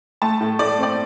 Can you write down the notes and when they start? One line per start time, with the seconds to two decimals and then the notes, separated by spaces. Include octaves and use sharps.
0.22 A3 A5
0.41 A2
0.59 A2 D5
0.78 C4 D5